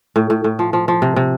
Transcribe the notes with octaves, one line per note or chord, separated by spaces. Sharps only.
A2
A2
A2
F3
F3
F3
C3
C3